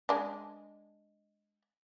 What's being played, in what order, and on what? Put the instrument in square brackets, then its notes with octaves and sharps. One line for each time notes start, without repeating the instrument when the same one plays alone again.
[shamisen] G#3 D4